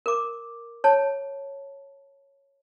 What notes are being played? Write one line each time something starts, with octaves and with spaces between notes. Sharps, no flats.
A#4 D6
C#5 A5